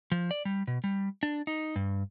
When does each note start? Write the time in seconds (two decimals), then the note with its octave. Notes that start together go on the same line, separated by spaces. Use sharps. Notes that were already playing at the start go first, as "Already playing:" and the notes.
0.12 F3
0.31 D5
0.45 G3
0.67 B2
0.84 G3
1.23 D4
1.47 D#4
1.76 G2